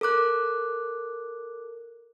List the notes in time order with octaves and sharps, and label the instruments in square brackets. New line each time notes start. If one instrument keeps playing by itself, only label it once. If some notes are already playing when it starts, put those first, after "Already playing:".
[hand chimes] A4 A#4 D6 F#6